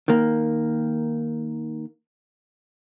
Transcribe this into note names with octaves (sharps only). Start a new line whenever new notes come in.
D#3 A#3